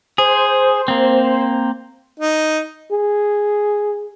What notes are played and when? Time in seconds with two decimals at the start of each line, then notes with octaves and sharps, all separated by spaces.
0.18 G#4 C5
0.88 A#3 C4
2.20 D#4
2.92 G#4